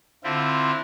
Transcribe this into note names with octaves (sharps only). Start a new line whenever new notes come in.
D3 C4 E4 F4